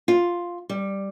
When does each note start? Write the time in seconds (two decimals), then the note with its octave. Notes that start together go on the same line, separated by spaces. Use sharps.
0.08 F4
0.69 G3